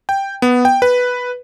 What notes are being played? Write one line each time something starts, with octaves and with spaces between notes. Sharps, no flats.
G5
B3
G5
B4